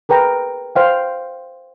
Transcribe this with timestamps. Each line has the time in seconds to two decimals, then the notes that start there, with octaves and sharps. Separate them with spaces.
0.09 G#4 A#4 B4 G5 A#5
0.76 C5 F5 G5